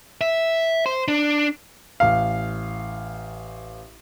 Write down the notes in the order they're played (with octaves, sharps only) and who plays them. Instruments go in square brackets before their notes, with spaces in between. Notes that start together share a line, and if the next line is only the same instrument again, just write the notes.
[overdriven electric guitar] E5
C5
D4
[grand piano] A1 F5